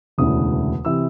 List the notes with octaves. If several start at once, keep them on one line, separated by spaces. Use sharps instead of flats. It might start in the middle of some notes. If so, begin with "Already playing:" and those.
E1 D2 C#3 E3 D#6
C3 E3 E6